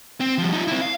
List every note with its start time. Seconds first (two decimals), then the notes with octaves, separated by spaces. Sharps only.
0.20 C4
0.38 F3 G3
0.52 D#4 F4
0.68 C4 E4
0.82 F5